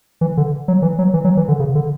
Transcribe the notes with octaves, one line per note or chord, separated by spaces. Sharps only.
E3
D3
F#3
E3
F#3
E3
F#3
E3
D3
C#3
D3